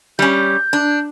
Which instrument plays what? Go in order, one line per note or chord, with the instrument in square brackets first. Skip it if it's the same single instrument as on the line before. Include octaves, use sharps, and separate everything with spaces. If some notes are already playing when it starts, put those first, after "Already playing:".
[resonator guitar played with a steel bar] G3 C#4 [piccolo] G6
[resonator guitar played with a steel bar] D4